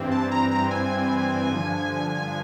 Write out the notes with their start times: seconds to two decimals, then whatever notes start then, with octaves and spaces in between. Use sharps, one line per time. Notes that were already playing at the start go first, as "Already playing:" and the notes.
Already playing: G2 E3 G3 C4
0.11 A5
0.31 A#5
0.51 A#5
0.71 G#5
1.50 G2 D3 F3